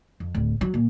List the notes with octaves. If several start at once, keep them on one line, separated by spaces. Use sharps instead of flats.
F2
D1
F#3
A#2